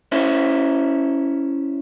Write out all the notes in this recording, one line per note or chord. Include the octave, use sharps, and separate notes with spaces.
C#4 E4 C5